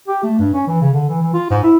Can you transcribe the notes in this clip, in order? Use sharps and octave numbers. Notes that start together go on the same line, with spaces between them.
G4
A3
G2
C#4
E3
C#3
D3
E3
E3
F4
G#2
E4